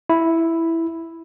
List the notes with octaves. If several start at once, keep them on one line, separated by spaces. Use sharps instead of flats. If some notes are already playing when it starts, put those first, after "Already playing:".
E4